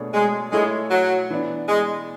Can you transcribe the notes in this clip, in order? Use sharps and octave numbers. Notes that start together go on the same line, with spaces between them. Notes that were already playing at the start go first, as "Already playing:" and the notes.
Already playing: B2 A3 D4 G#4 C#5
G#3
G#3 A3 E4 A4 C#5
F#3
E3 B3 D4
G#3